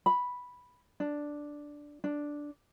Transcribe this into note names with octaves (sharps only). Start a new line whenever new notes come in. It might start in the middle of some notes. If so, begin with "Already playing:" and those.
B5
D4
D4